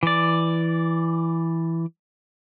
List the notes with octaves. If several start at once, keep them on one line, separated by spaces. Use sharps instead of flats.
E3 D5